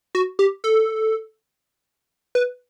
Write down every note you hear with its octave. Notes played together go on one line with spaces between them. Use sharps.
F#4
G4
A4
B4